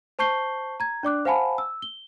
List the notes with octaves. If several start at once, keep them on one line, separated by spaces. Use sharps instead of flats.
C5 A5 C#6 G6 C7 G7
A#5 G#6
D4 D5 D6 F#6
C5 F5 F#5 G#5 A5 B5
E6
G7